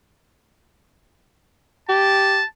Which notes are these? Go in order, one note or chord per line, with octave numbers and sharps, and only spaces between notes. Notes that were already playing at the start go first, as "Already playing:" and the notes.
G4 A5